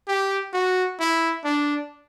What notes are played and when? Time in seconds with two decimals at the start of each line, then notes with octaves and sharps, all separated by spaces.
0.08 G4
0.53 F#4
1.00 E4
1.45 D4